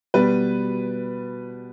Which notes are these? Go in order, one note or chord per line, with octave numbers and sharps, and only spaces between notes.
B2 G3 B4